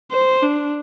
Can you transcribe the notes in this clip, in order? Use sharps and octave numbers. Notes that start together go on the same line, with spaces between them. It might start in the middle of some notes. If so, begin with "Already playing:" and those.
C5
D4